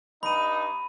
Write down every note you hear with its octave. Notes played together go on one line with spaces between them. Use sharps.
G2 D#4 B5 D#7